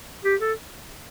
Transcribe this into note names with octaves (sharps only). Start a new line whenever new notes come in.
G4
A4